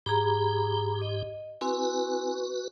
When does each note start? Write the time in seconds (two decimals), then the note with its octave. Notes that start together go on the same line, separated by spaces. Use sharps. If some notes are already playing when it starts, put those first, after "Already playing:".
0.06 G#2 G4 G#4 A#5 B5
1.02 D#5
1.61 C4 E4 F#4 B4 G#5